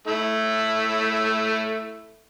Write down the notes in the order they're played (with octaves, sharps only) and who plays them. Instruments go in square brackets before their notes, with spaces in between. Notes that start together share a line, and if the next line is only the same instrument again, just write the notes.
[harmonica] A3 E4